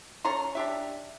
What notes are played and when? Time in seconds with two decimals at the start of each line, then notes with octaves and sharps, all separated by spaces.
0.25 C#4 A4 A#5 C6
0.55 D4 G4 E5